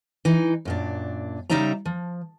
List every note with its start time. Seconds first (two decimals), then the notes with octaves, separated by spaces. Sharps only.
0.25 E3 D#4
0.65 F#2 A#2 D4
1.50 C#3 G3 D#4 D5 E5 A#5
1.85 F3